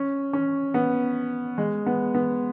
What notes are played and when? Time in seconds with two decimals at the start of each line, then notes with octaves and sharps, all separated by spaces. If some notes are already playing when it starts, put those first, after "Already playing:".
Already playing: C#4
0.33 C#4
0.74 B3
1.58 G#3
1.86 B3
2.15 B3